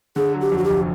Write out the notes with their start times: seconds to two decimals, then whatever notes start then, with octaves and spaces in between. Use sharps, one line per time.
0.16 D3 G#4
0.34 F#3
0.41 G4
0.52 F2
0.58 F#4
0.64 G4
0.70 F1